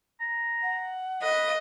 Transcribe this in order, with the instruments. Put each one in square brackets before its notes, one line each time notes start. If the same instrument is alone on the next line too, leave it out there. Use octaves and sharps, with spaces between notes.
[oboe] A#5
[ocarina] F#5
[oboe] B4 [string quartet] D#5